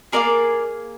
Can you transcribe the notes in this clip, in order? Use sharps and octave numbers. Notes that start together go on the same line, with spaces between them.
A#3 D4 G#4 A#4 D5